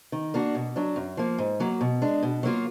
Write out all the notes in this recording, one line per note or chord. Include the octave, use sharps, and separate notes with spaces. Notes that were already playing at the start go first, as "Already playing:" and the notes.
D#3
A#3 D4 F#4
B2
F#3 D4
F#2
F3 A#3
G#2
F#3 A#3
B2
G#3 D4
B2
F#3 A#3 F4